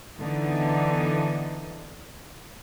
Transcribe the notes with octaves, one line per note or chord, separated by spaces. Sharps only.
D3 E3 B3 D#4